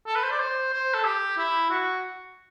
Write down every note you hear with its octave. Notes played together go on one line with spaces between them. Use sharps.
A4
B4
C5
D5
C5
C5
A4
G4
E4
F#4